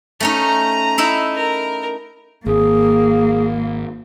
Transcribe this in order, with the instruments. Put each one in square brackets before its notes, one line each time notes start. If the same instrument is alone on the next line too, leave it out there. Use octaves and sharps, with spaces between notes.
[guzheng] A3 C#4 D#4 [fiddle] A#5
[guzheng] D#4 E4 E5
[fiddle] A#4
[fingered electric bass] G#1 [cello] A#3 [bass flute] G#4